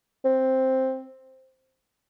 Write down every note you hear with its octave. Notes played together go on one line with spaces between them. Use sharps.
C4